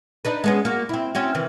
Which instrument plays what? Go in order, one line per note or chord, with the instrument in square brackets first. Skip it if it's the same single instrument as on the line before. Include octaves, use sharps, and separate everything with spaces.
[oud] D4 D#4 B4
G#3 B3 C#4
A#3 F#4
C4 E4
C4 C#4 F#4
C3 D#3 E3